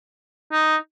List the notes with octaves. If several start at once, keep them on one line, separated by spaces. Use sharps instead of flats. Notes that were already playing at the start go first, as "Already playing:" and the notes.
D#4